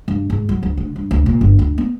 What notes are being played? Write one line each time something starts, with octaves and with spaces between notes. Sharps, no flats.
G2
G#2
F#3
D2
D3
G2
D2
A#2
G1
D2
B3